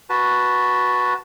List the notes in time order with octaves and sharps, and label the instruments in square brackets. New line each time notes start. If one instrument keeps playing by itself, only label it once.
[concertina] F#4 B4 A5